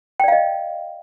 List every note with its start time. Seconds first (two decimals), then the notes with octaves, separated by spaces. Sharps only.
0.20 G5
0.24 D5
0.28 F5
0.32 D#5